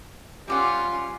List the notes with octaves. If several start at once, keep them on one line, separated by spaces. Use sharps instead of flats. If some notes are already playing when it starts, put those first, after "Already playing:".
G3 C#4 F4 G4 F#5